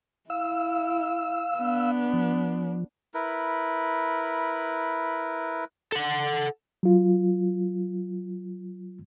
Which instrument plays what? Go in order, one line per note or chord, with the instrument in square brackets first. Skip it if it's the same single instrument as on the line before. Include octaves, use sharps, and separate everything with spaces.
[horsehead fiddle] E4 [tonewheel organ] F5 E6
[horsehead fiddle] B3 D4
[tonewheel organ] F3
[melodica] E4 A#4 B4
[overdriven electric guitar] A4 F#5
[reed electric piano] F#3 F4